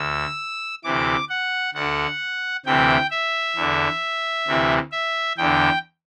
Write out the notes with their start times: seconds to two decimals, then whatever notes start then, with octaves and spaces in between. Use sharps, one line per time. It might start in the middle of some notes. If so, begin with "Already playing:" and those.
Already playing: D2 E6
0.84 D2 C3 E3 D6
1.29 F#5
1.74 D2 D3 F#5
2.66 D2 C3 E3 G5
3.11 E5
3.56 E2 D3
4.47 D2 C3 E3
4.92 E5
5.38 E2 D3 G5